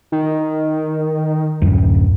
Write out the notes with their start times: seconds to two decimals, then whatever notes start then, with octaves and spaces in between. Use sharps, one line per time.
0.12 D#3
1.62 D1 F#2